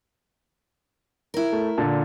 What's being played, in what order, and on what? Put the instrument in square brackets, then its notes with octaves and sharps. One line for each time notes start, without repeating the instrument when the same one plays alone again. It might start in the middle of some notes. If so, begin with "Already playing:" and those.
[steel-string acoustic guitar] E4 A#4
[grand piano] A3
A#2 D3 A5